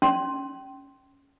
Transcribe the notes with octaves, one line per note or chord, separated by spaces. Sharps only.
C#4 C6